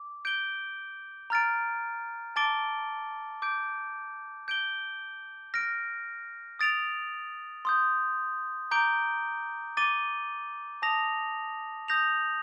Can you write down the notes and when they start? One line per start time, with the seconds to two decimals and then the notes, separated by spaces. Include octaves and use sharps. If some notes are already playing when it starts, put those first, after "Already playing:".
Already playing: D6
0.25 G6 D7 G7
1.30 A#5 F6 A6 D7
2.36 A5 D6 A6 D7 G7
3.42 D6 G6 D7
4.48 G6 D7 G7
5.54 F6 A#6 D7
6.59 D#6 A6 D7 F7
7.65 C6 D#6 G6
8.71 A#5 D6 G6 D7 G7
9.77 D6 A6 D#7 G7
10.82 A5 D#6 A#6 F7
11.88 D#6 G6 A#6 F7